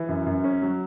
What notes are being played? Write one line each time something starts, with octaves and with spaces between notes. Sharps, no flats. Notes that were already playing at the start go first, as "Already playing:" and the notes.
Already playing: E3
F#2
F#2
C#4
F#3